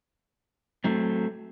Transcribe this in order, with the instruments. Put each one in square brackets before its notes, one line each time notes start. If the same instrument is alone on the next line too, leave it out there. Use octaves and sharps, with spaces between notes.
[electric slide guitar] F#3 A3 C4